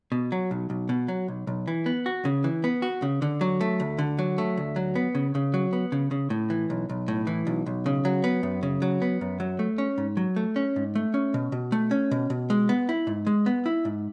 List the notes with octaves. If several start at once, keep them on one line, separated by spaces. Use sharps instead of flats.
B2
F#3
B1
B1
B2
F#3
B1
B1
E3
B3
F#4
C#3
E3
B3
F#4
C#3
D3
F#3
A3
D2
D3
F#3
A3
D2
F#3
B3
C#3
C#3
F#3
B3
C#3
C#3
A2
E3
B1
B1
A2
E3
B1
B1
C#3
F#3
B3
F#2
C#3
F#3
B3
F#2
F#3
A3
C#4
G#2
F#3
A3
C#4
G#2
A3
C#4
B2
B2
A3
C#4
B2
B2
G#3
B3
E4
G#2
G#3
B3
E4
G#2